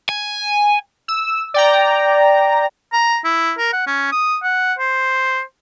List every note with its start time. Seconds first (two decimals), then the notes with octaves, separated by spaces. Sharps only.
0.09 G#5
1.08 E6
1.54 D5 G5 A#5
2.93 A#5
3.24 E4
3.58 A#4
3.73 F#5
3.87 C#4
4.12 D#6
4.43 F#5
4.79 C5